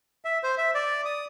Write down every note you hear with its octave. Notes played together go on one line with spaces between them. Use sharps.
E5
C5
E5
D5
D#6